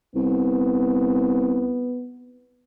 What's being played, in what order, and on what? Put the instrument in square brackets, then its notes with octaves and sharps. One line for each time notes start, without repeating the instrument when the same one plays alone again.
[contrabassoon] C2 [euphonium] B3